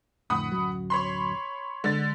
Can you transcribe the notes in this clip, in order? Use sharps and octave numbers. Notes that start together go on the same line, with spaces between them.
F2 A2 D3 F#5 B5 D#6
D1 F#2 F#3
C#5 B5 C6
D3 G#3 A6